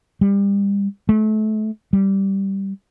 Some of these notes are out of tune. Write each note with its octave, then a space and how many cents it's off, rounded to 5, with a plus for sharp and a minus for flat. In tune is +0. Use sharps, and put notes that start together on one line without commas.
G3 +30
A3 -30
G3 -5